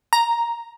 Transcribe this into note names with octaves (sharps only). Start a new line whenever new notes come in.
A#5